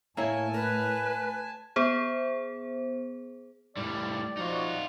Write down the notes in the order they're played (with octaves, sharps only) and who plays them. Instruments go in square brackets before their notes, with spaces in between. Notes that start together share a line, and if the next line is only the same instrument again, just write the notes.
[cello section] A2 [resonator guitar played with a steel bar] A#3 E4 C#5 [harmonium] G#5 A5
[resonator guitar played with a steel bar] A#4 [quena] B4
[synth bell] B3 G#4 C5
[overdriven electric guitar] A2 G3 [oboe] D5
[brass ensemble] F3 F#4 [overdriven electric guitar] D#4 F4